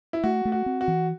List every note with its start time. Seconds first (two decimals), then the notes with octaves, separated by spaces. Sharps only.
0.13 E4
0.24 A3 F#4
0.45 A3
0.52 F#4
0.66 C4
0.81 F#4
0.88 E3